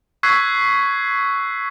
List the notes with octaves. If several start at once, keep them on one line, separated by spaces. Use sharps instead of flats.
C#6 E6 F#6 G#6 B6 C7